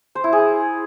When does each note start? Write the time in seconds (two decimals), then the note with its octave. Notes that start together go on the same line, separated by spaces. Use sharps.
0.15 C5
0.24 E4
0.32 G#4